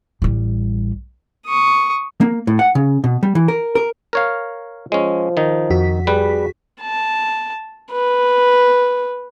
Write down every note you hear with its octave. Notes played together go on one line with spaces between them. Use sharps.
A1 G3
C#6 D#6
A#3
A2
F#5
C#3
B2
G3
E3
A#4
A#4
A#4 C#5 F5
F3 G#3 C#4
D#3 D#4
F2 F#4 B6
G3 G#4 B4
A5
B4